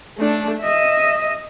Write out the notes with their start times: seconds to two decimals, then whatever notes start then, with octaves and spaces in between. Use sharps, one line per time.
0.18 A3 D4
0.60 D#5 E5